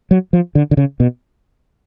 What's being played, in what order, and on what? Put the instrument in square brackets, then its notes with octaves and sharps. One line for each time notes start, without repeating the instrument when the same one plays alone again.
[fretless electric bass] F#3
F3
D3
D3
C#3
B2